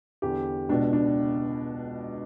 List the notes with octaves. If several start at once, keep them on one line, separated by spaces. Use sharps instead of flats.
E2 D3 G4
C#2 B2 D4
D4